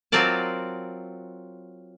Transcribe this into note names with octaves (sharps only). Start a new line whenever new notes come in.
F#3 C4 F4 A#4 D5 A5